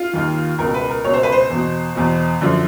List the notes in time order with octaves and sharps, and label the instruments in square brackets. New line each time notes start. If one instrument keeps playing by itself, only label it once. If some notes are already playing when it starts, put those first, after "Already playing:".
Already playing: [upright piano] F4
D#2 D#3
C#2 B2 A#4
B4
A#4
C#2 B2 C#5
C5
B4
C5
E2 B2
E2 B2
F#2 D3 F3